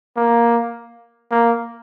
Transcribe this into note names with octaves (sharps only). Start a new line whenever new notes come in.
A#3
A#3